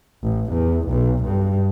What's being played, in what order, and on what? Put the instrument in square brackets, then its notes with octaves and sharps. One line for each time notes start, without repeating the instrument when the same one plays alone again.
[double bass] A1
E2
B1
G2